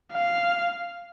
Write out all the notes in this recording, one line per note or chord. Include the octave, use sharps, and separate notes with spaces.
F5